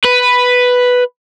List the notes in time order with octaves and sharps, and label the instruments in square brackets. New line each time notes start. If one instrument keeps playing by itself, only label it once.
[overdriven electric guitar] B4